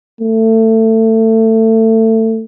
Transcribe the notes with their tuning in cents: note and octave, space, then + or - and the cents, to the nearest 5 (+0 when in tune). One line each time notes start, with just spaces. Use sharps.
A3 +25